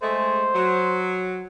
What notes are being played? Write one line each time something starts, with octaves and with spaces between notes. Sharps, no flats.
G#3 A3 C5
F#3